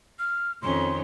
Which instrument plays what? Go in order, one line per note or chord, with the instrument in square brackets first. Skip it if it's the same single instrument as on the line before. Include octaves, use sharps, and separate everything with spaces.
[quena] F6
[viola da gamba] F2 D#3 C#4 [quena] C6